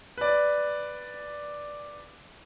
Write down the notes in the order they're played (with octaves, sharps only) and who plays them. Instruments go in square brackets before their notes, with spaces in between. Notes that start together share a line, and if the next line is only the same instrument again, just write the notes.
[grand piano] B4 D5